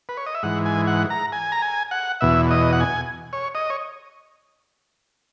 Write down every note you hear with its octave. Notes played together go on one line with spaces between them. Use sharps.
B4
C#5
D#5
E5
G#2 E3 F#5
G#5
F#5
A#5
G#5
A#5
G#5
F#5
E2 B2 E5
D#5
F#5
G#5
C#5
D#5
C#5